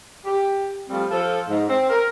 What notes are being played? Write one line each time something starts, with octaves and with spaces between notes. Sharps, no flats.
G4
F3 G3 A3 C4
F3 A4
G#2
C4
A#4